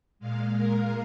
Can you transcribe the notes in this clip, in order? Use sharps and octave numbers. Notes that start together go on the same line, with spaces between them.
A#2 G#3 F5
A#4